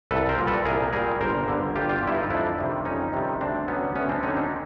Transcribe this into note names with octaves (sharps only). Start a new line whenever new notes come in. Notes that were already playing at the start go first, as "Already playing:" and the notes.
C2 A4 B4
A#4 C5
A#2 G3
A4 B4
C2 G#4 A#4
A#2 G3 G#4 A#4
G1 A#4 C5
G2 D3
G1 F4 G4
F4 G4
G2 D3 E4
D#4 F4
F2 D4 E4
C3 D#3 G3
F2 C#4 D#4
C3 D#3 G3
D2 C4 D4
D3 F#3 B3 C#4
D2 B3 C#4
C4 D4
D3 F#3 C#4 D#4
C4 D4